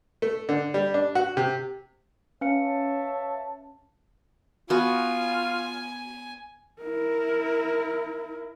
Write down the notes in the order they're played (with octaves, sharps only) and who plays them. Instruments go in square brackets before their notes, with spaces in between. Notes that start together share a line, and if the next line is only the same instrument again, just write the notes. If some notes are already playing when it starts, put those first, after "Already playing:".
[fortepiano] A3
D3
G3
D4
F#4
C3
[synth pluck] C#4 [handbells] B4 F5 C#7 [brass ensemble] C#5 E5 A5
[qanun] B3 F#4 [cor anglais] F4 [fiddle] G#5
[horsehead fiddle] E4 A#4